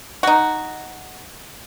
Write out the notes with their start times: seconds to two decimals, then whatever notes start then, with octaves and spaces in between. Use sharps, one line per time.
0.23 D#4 F#4